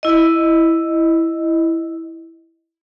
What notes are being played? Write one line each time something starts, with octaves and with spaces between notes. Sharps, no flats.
E4 D#5